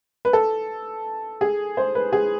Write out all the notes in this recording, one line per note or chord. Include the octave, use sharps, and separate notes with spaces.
B4
A4
G#4
C5
B4
G#4